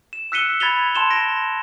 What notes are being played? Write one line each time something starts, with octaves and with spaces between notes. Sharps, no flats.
E7
E6 F#6 B6 C#7 D#7 G7
B5 G#6 A6 B6 F7 G7
A5 C6 E7 G7
A#6 D7